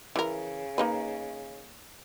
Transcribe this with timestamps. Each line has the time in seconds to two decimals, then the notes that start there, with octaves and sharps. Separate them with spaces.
0.16 C#3 E3 A#4
0.78 A#3 D#4 B4